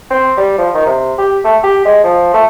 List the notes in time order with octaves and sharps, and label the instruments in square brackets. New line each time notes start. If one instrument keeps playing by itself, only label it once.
[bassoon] C4
G3
F3
D#3
C3
G4
A3
G4
G#3
F3
A3